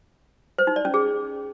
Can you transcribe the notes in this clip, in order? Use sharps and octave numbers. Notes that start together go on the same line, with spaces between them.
C5
D#4
D5
C#4
G#4